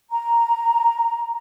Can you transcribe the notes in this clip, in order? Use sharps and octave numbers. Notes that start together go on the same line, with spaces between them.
A#5